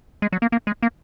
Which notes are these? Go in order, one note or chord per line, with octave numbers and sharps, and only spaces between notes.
G#3
F#3
A#3
A#3
G#3
A#3